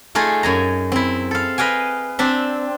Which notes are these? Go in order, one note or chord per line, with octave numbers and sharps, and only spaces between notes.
A3 D#4 F4 G#4
F#2 G#5 A#5
C4 E4
A4 F5
B4 D#5 F5 G5 G#5
C4 D4 E5